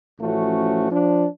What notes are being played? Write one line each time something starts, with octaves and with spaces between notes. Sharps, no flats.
A1 F3 A3 C#4 F#4
F3 D4